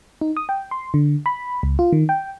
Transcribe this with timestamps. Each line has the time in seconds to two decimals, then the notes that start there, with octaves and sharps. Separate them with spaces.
0.21 D#4
0.37 D#6
0.49 G5
0.71 C6
0.94 D3
1.26 B5
1.63 C#2
1.79 F4
1.93 D#3
2.09 G5